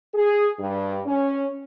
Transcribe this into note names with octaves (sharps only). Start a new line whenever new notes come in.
G#4
G2
C#4